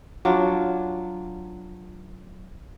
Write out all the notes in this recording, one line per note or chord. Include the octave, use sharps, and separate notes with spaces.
F#3 D4 F4